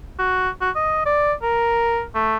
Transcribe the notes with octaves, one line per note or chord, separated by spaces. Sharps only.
F#4
F#4
D#5
D5
A#4
A3